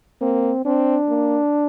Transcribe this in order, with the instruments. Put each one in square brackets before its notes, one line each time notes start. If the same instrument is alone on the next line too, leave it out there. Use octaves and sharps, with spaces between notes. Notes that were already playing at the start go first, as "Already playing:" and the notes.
[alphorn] A#3 [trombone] C4
[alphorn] C4 [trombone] D4
[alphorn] A#3